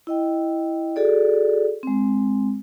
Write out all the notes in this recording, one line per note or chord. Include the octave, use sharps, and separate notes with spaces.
E4 D#5 G5
F#4 G#4 A4 D5
G#3 C4